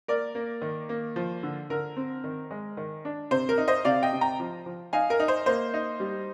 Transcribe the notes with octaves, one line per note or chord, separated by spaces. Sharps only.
A#3 A#4 D5
A#3
D#3
A#3
F3
D3
D3 A#4
C4
D#3
G#3
D#3
D4
C3 C5
A#4
D#4
C5 D#5
C3 D5 F5
D#5 G5
C3
G5 A#5
F3
F3
D#4 F5 G#5
A#4
D#4
C5
A#3 C5
D#4
G3